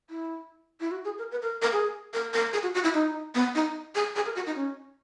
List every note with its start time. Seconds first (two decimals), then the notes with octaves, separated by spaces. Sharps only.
0.10 E4
0.81 E4
0.91 F#4
1.05 G#4
1.18 A#4
1.32 B4
1.42 A#4
1.62 A#4
1.73 G#4
2.14 A#4
2.34 A#4
2.53 G#4
2.63 F#4
2.74 F#4
2.84 E4
2.94 D#4
3.35 B3
3.55 D#4
3.95 G#4
4.16 G#4
4.26 A#4
4.35 F#4
4.46 D#4
4.55 C#4